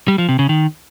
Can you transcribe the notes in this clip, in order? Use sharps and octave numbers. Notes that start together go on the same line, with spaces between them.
G3
F3
C3
C#3
D#3